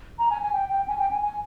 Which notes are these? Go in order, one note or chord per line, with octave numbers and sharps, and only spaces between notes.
A#5
G#5
G#5
G5
G5
G#5
G5
G#5
G#5